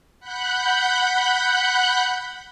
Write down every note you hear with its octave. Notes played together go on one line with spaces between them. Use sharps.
F#5 B5 F#6 G6